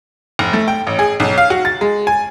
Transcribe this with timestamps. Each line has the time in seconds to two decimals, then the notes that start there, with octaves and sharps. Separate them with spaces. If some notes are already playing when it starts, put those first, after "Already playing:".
0.39 F1
0.53 A3
0.68 G5
0.87 A1
0.99 G#4
1.20 B1
1.38 F5
1.50 F#4
1.65 A6
1.81 G#3
2.07 G#5